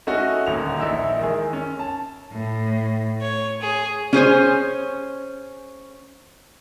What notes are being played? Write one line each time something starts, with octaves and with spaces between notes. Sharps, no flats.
A3 C#4 D#4 E4 F#4 D#5
D#1 D2 F7
A#1 D#4 E4 E6
D#3 G#3 G#4
C#4
A5
A2
C#5
G#4
C#4 G#4 C5 C#5